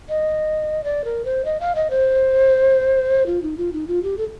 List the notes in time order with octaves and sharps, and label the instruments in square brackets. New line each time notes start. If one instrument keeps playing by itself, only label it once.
[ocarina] D#5
D5
A#4
C5
D#5
F5
D#5
C5
F4
D#4
F4
D#4
F4
G4
A4